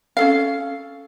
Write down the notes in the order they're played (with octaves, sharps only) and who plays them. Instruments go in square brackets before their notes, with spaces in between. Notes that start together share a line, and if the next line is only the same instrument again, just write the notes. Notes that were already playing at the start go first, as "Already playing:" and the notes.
[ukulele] C#4 A4 F5